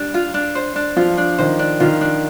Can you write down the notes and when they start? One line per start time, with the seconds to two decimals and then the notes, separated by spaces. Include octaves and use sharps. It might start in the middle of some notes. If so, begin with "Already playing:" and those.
Already playing: G3 D4
0.14 F4
0.34 D4
0.55 C5
0.76 D4
0.97 F3 F4
1.18 D4
1.38 D#3 C5
1.59 D4
1.80 D#3 F4
2.01 D4